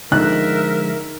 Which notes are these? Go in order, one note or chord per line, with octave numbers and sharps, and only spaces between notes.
D3 F3 G#3 D#4 A#4 E5 F#6